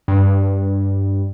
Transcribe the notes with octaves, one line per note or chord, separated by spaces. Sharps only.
G2